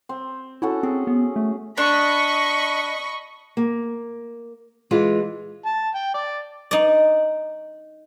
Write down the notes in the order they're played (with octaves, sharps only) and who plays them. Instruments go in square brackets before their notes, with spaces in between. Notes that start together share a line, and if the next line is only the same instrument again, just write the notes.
[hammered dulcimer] C4
[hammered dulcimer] C#4 F#4 A4 [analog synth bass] E4
[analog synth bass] C4 [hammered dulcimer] G#4
[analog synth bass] B3
A3
[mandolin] D4 [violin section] D#5 B5 C#6
[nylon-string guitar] A#3
E3 G#3 F4
[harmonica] A5
G5
D5
[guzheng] D#4 D5